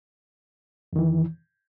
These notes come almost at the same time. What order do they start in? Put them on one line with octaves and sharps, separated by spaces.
F2 D#3 E3